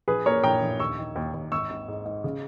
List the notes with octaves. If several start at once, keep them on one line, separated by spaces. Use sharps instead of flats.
A#1 G#4 B4
A#2 A#4 C#5
A#1 G5 A#5
A#1
D#2 C#6 E6
D#3
D#2
D#2
G#1 C#6 E6
G#1
G#2
G#2
C#3